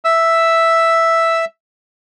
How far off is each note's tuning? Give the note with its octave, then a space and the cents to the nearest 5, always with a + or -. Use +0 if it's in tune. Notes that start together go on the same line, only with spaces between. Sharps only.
E5 +0 E6 +0